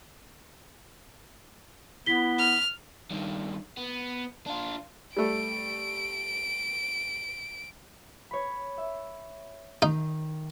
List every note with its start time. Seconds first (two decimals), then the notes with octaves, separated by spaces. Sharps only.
2.06 B3 E4 B6 G7
2.38 F6
3.11 G2 D#3
3.77 B3
4.46 D4 F4
5.17 G3 A3 D7
8.31 C#5 B5
8.78 E5
9.82 D#3 D#4